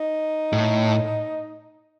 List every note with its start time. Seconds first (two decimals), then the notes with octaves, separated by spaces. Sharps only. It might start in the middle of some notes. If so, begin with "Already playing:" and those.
Already playing: D#4
0.53 A2